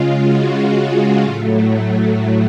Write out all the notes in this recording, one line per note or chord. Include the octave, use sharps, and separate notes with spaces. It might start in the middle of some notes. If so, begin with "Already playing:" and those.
Already playing: C#3 G#3 F4
F#4
F4
A2 F#3 A3